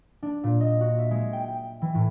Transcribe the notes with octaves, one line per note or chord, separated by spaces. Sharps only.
D4
A#2
D#5
F#4
E5
G#3
G5
G5
E3
A2